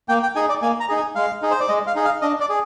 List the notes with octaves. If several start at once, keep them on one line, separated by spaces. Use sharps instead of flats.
A#3 G5
G5
D#4 G#4 G#5
D5
A#3 G#5
A#5
D#4 G#4
G#5
G#3 F5
D#4 G#4
C5
D5
G#3 D#5
F5
D#4 G#4
F5
D4 D#5
D5
G#4